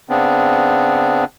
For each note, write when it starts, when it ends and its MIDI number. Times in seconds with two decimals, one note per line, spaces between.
0.09 1.25 49
0.09 1.25 59
0.09 1.25 60
0.09 1.25 62